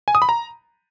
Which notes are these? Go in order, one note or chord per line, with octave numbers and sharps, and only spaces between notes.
G#5
D#6
B5
A#5